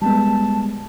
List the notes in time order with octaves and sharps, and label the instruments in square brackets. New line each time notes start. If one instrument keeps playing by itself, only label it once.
[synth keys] G3 G#3 B3 [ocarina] A5